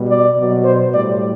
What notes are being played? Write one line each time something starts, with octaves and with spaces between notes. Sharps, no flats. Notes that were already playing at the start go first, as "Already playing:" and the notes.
Already playing: B2 G3
D5
B2 F#3
C5
A2 G3 D5